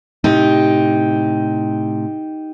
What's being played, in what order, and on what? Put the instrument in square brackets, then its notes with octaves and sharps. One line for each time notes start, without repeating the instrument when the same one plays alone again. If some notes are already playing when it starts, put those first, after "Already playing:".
[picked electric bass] A2 C3 [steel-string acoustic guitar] D#4 G4